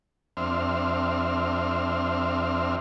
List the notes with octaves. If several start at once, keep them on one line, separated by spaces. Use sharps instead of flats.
F2 C4 D4 E5 C6 F6